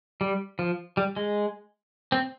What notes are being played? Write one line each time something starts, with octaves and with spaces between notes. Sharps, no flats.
G3
F3
G3
G#3
C4